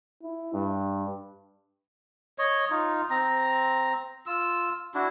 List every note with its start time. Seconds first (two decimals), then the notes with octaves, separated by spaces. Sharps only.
0.22 E4
0.54 G2
2.38 C#5 D#5
2.70 D#4 F4
3.10 C4 A#5
4.26 F4 E6
4.94 D4 E4 F#4